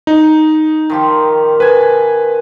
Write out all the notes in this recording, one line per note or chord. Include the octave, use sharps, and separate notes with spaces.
D#4
D#3 F3 G4
G#4 B4 G#5